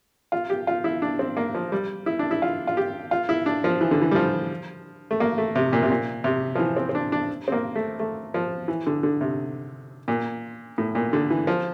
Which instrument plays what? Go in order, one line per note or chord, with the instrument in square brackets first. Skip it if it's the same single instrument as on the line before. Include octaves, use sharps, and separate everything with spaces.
[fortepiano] F4
G4
F4
E4
D4
C4
A#3
F3
G3
E4
D4
E4
F4
F4
G4
F4
E4
D4
F3
E3
D3
E3
G3
F3
A3
A#3
A3
C3
A#2
C3
A#2
C3
F3
E3
C4
C4
D4
D4
C4
A#3
A3
A3
F3
E3
D3
D3
C3
A#2
A2
A#2
D3
E3
F3